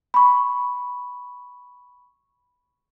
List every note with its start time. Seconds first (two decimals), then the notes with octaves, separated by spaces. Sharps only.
0.14 B5 C#6